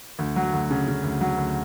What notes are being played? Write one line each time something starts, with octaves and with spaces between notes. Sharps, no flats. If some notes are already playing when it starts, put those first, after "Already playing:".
D2
F#3
D2
C#3
C#3
D2
F#3
D2